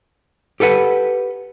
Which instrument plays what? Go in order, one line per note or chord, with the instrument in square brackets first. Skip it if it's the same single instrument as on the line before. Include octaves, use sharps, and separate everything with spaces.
[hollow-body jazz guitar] G4 A4 B4 F#5